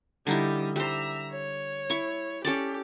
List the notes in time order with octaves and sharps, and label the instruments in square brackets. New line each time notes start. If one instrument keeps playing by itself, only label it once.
[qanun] D3 D#4 E4 [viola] G3 D#5
[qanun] G3 C5 [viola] E5 A#5
[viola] C#5
[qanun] E4 C#6
[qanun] C#4 A4 D5 [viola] G4